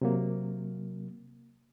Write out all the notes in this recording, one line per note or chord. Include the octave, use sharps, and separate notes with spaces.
C3 F#3 A#3